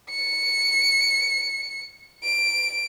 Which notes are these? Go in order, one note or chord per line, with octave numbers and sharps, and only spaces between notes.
C#7
D7